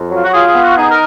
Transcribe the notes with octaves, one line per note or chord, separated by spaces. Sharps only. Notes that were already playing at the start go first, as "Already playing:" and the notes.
Already playing: F2
F#3 F4
F#4
F4 G#4
G#4
B3
F#4
D#4 G#4
A#4